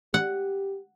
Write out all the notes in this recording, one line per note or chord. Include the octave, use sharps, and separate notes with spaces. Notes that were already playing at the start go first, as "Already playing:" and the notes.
G4 F#5